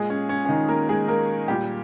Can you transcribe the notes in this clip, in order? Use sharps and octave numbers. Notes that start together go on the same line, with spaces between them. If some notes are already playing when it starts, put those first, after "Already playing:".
Already playing: A#2 G#3 G#4
C#4
C#4
C#4
D#3 D#4
A#3 A#4
G#3 G#4
A#3 A#4
A#2 G3 G4